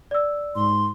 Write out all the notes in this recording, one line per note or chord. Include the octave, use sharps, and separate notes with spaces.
D5 E6
G#2 C6